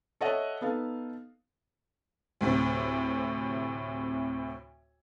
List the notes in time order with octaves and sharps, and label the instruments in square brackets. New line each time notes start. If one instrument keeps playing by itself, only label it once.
[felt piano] A4 C#5 D#5 E5 F#5
B3 D#4 A4 F5
[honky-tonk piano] D2 A2 C3